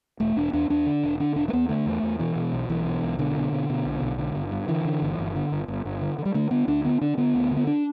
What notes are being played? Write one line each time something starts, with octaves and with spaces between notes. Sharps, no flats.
E1 A3
E1 D4
E2 D4
E2 D4
D3
E1
D3 D4
E1 D4
A3
E2 B3
D3 A3
E2
E2
B2 E3
B2
B1
B1 E3
B2
B1
B2 D3
B2
B2
B2
B1
B1
D3
G1
G2
D3 E3
D3
G1
G1
D3
G1
G1
G1
D3
D3
G3
D3 A3
D3 B3
D2 D4
D3 B3
D3 D4
D3 B3
D2
D3
B3
D4